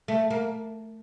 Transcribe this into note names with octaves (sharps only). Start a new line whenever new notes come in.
A3
A#3